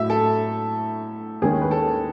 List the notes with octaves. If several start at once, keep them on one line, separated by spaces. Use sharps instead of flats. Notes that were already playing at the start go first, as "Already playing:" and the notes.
Already playing: A2 F#3 A3 E5
A4
D#2 D#3 G#3 C#4 G#4
B4
A4